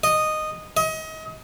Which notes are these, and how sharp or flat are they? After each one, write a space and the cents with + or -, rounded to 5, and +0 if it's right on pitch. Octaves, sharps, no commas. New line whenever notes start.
D#5 -10
D#5 +30